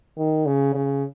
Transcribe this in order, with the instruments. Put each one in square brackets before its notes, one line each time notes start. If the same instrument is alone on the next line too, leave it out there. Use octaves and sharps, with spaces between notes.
[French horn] D#3
C#3
C#3